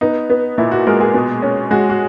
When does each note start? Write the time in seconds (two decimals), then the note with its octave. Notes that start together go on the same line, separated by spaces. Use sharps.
0.01 B3 D#4
0.30 B3
0.58 A#2 E4
0.71 F#4
0.87 G#3 A#4
1.00 G#4
1.14 B2
1.42 C#4
1.71 G#3 F#4
1.89 F#4